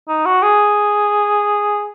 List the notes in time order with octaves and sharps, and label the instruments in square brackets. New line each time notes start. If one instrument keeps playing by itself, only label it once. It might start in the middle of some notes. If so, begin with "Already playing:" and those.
[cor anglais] D#4
F#4
G#4